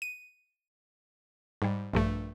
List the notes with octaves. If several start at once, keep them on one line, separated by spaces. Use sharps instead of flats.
D#7
G#2 G3
A#1 G2 A3